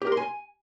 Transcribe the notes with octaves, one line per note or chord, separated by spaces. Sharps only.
G4
A#4
C6
G#5